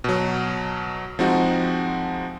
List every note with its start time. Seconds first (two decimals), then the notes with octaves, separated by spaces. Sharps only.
0.04 B2 F#3
1.19 F3 G#3 C4 D#4 F#4